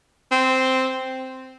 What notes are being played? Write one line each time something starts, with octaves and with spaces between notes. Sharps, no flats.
C4